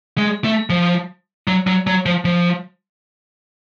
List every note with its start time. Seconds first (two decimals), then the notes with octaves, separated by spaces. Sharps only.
0.18 G#3
0.44 A3
0.70 F3
1.47 F#3
1.67 F#3
1.87 F#3
2.06 F3
2.25 F3